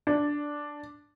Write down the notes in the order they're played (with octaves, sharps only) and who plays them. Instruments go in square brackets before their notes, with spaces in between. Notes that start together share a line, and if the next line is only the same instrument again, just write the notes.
[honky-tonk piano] D4